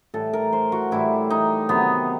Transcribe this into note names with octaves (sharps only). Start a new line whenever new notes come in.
A2 E3 G3 A4
A#4
C5
F#4
A2 E3 G3 E4
D#4
C3 D#3 F#3 B3